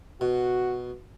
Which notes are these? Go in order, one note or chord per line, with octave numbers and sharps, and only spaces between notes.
B2 F#4